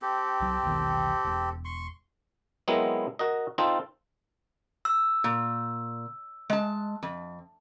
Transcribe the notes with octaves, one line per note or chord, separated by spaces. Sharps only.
C4 G4 A4
C2 F#3
E1 B1 D#3
E1
C6 C#6
F#3 G#3 B3 C4 E4 A#4
F#4 A#4 D#5
C4 D#4 F4 A4 C5
E6
A#2
G#3 A5
F2